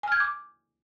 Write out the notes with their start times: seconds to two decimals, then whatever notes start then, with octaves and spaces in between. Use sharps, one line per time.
0.03 G#5
0.08 F6
0.12 G#6
0.16 G6
0.20 D6